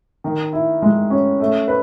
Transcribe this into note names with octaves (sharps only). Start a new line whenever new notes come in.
D#3
E4
G#3
C#4
A3
B4